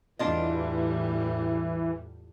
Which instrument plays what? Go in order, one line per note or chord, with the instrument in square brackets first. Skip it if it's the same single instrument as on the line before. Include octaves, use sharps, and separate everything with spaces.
[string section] E2 A2 G3 [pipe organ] E3 [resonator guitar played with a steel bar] D4 F4 D#5